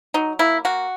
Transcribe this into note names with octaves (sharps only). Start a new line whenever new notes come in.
F#3 D#4
A#3 E4
A#3 F#4